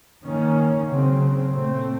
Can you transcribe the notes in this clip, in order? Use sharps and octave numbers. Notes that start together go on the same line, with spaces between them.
D#3 A#3 C#4
C#3 F#3 C4
A#2 A3 C4